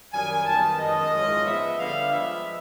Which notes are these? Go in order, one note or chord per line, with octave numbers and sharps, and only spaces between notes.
F#2 D#3 G3 G#5
F#2 D#3 G3 B3 A5
F#2 D#3 G#3 D#5
G#2 E3 G#3 C#4 F4
F3 G#3 B3 E5
D3 G3 B3 F5
F3 G#3 B3 E5